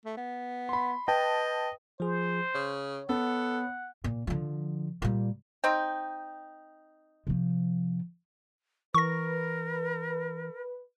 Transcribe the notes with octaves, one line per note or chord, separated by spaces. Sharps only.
A3
B3
B5 C6
B4 D#5 G5 A5
F3 G#4 C5
C#3 C#5
B3 A4 F#5
A#2
D3 F3
A#2 G3
C4 D#4 G5
C3 F3
E3 A#4 B4 C#6 A#6